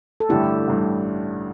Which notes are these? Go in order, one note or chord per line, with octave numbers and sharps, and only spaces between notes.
A4
A1 G2 D3 A3 E4 G4
A1 G2 D3 A3